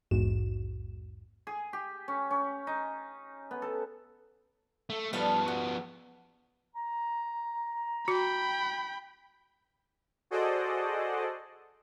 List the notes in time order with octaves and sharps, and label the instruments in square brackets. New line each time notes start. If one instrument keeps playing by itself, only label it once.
[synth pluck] A#1 E2 G#2 F#4 E7
[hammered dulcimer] G#4
G4
C#4
C#4
D#4
B3
A4
[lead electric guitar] A3
[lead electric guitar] F3 B3 [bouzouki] G3 A4 F5
[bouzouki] F#4
[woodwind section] A#5
[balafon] F#4 [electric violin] G5 B5
[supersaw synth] F#4 G#4 A4 C5 D5 D#5